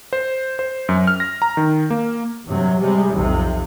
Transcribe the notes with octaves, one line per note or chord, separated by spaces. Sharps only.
C5
C5
F#2
F6
A#6
A#5
D#3
A#3
G2 C3 F#3
C3 G3 G#3
B1 F2 C3